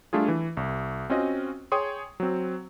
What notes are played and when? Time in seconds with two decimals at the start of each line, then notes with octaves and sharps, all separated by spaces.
0.13 G3 A3 D4 F4 G#4
0.28 E3
0.57 C2
1.10 C4 C#4 F4 F#4 D#5
1.72 G#4 C#5 G5 C6 D#6
2.20 F#3 C4